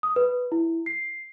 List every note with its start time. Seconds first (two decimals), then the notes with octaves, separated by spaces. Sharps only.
0.03 D#6
0.16 B4
0.52 E4
0.86 C7